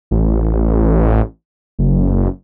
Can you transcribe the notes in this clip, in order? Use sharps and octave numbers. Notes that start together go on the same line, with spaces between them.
A1
F#1